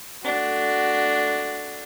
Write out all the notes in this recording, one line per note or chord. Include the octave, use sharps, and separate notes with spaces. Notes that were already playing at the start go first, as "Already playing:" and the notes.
A3 D4 F#4